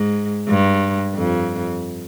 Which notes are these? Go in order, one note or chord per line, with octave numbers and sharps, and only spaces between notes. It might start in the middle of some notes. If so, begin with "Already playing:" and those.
Already playing: G#2
G2
F2